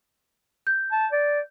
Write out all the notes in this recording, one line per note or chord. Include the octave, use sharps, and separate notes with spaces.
G6
A5
D5